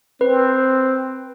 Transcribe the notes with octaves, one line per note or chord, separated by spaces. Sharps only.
C4 B4